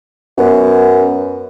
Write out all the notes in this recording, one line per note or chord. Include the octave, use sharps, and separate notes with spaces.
F#2 B3